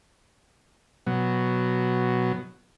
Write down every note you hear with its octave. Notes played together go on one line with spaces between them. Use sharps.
B2 F#3